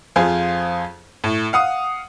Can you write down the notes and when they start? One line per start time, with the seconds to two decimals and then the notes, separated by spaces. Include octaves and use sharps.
0.16 F2 F4 G#4 C5
1.24 A2
1.53 F5 F#5 D#6